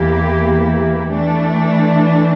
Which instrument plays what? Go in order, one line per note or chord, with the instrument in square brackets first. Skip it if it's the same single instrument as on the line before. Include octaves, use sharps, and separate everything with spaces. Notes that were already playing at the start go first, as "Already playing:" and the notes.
Already playing: [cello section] E2 E3 A#3 E4 G4
E3 A3 D4